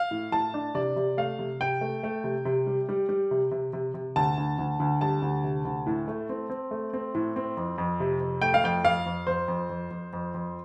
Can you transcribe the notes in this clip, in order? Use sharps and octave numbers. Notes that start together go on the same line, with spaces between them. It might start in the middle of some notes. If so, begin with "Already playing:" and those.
Already playing: F5
A2
A2 A5
D4
C3 D5
C3
A3 F5
C3
C3 G5
A3
A3
C3
C3
G3
G3
G3
C3
C3
C3
C3
D2 A5
D2
D2
D2
G3 A5
D2
C3
D2
A2
A3
C4
C4
A3
C4
A2
C4
F2
F2
C3
F2
A3 G5
F5
F2 G5
F2 F5
F2
F2 C5
F2
F2
F2
F2
F2